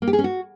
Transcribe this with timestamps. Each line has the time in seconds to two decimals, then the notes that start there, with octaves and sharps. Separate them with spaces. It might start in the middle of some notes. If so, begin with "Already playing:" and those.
0.02 A#3
0.07 G4
0.13 G#4
0.19 C#4
0.24 F#4